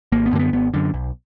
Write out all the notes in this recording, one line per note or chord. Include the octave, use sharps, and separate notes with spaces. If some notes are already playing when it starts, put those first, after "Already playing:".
G#1 A#3
B3
F#2 D3 A#3
B3
G#1 B3
F#2 D3
B1